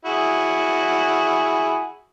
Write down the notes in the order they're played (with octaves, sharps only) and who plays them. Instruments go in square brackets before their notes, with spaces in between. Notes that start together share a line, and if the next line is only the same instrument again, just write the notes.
[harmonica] E4 F#4 G#4